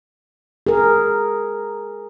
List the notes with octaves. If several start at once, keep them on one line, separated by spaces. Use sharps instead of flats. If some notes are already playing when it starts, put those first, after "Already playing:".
G#4 A#4